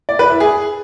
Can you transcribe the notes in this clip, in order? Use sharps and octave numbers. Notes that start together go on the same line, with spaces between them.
D5
B4
E4
G#4